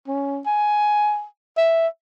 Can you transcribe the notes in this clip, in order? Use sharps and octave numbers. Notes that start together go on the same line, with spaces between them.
C#4
G#5
E5